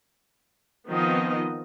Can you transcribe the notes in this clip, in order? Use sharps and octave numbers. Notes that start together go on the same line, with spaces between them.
D#3 F3 B3 C4 D#4 D#5